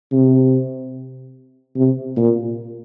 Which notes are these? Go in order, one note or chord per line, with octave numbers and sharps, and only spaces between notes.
C3
C3
A#2